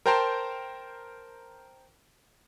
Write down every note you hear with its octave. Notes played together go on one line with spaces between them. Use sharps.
A#4 C5 G5 A5 A#5 C6